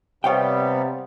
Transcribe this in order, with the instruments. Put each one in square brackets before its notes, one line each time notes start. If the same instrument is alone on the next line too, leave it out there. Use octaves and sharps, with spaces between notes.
[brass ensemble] C3 [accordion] G3 B3 [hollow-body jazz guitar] C#5 F5 G5